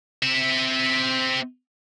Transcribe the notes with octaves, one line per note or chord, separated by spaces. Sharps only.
C4 E5